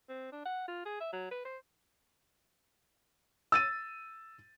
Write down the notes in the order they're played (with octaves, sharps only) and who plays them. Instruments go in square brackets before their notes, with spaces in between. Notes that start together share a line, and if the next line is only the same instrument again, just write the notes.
[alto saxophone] C4
D4
F#5
F4
G#4
E5
F#3
B4
C5
[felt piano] E6 A6 D#7